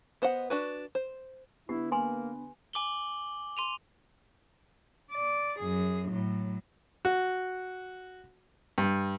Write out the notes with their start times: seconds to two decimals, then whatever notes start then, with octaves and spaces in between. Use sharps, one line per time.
0.22 B3 C5 D#5 F#5
0.50 D4 F#4 B4
0.95 C5
1.69 D3 B3 E4 G4
1.92 A#3 B4 G#5 C6
2.73 G#5 D6 F#7 G7
3.57 C6 D#7 F7
5.12 D5
5.59 F#2 G#4
6.08 A2 F#3
7.05 F#4
8.78 G2